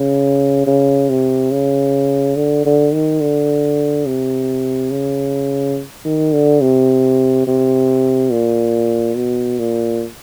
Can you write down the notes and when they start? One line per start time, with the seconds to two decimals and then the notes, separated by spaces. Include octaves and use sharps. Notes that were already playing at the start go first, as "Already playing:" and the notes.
Already playing: C#3
0.67 C#3
1.09 C3
1.51 C#3
2.36 D3
2.65 D3
2.93 D#3
3.21 D3
4.06 C3
4.91 C#3
6.05 D#3
6.34 D3
6.61 C3
7.47 C3
8.31 A#2
9.16 B2
9.59 A#2